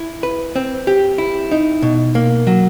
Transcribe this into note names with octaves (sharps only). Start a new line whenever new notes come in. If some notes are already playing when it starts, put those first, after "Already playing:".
Already playing: E4
B4
C4
G4
E4
D#4
B2
A#3
F#3